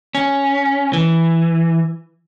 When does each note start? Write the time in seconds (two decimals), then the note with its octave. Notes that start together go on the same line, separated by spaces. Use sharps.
0.15 C#4
0.93 E3